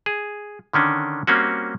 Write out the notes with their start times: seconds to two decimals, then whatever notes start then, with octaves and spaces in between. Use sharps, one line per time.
0.06 G#4
0.73 D3 D#3 C#4 D4
1.27 G3 A#3 C4 C#4 F#4